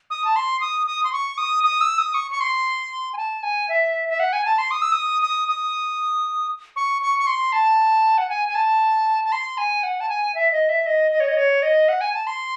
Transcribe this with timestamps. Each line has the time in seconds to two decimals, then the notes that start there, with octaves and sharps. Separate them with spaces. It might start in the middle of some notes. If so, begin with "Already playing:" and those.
0.10 D#6
0.25 A5
0.36 C6
0.61 D#6
0.87 D#6
1.04 C6
1.12 C#6
1.38 D#6
1.64 D#6
1.81 E6
1.98 D#6
2.14 C#6
2.31 C#6
2.40 C6
3.13 G#5
3.17 A5
3.43 G#5
3.69 E5
4.09 E5
4.20 F#5
4.33 G#5
4.45 A5
4.58 C6
4.71 D#6
4.82 E6
4.92 D#6
5.22 D#6
5.48 D#6
6.76 C#6
7.02 C#6
7.19 C#6
7.27 C6
7.53 A5
8.18 F#5
8.29 G#5
8.49 G#5
8.55 A5
9.25 A5
9.32 C6
9.58 G#5
9.83 F#5
10.00 A5
10.09 G#5
10.35 E5
10.52 D#5
10.69 E5
10.86 D#5
11.12 D#5
11.20 C#5
11.28 D#5
11.37 C#5
11.63 D#5
11.89 F#5
12.01 G#5
12.14 A5
12.27 C6